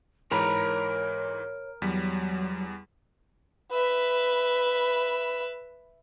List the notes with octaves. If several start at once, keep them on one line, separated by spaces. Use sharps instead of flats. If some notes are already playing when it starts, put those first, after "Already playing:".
G#2 E3 A#4 C#5 A#5 B5
E2 F#3 G3 B6
B4 E5